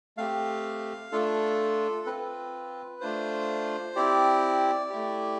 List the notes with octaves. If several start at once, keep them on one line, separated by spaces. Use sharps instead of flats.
A3 C4 G4 F5
A3 D4 F4 A4
C4 F4 B4
A3 D4 F4 C5
C4 E4 G4 D5
A3 E4 G4